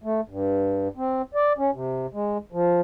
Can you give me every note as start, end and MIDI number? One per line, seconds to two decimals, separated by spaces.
0.04 0.21 57
0.29 0.88 43
0.97 1.22 60
1.35 1.53 74
1.58 1.71 61
1.74 2.06 48
2.13 2.38 56
2.52 2.81 53